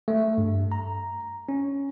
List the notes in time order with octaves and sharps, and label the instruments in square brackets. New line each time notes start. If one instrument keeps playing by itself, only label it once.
[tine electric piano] A3
G2
A#5
C#4